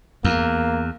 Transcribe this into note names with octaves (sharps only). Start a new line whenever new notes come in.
E2 A#3